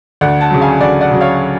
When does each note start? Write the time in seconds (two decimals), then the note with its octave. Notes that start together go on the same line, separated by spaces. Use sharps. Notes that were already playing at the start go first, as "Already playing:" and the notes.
0.21 D2 D5 F#5
0.41 F#5 A5
0.51 C#3 F#3
0.61 F5 G#5
0.81 D2 D5 F#5
1.01 D5 F#5
1.11 C#3 F#3
1.21 C#5 F5